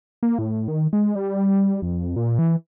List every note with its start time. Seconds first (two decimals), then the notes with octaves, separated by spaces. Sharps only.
0.23 A#3
0.39 A2
0.68 D#3
0.93 G#3
1.15 G3
1.82 F2
2.16 A#2
2.39 E3